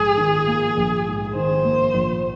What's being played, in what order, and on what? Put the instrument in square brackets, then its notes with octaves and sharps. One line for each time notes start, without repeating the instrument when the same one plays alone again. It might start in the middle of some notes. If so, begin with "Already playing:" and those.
Already playing: [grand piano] A#1 G#2 [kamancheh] G#4
[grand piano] D#3
A#3
A#1
G#2
[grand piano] D#3 [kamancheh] C5
[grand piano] A#3
A#1